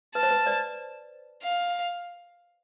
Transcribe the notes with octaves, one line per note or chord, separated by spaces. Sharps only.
B4 A5
C5
B4
B4 D5
F5